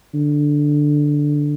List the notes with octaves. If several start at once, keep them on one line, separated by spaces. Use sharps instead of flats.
D3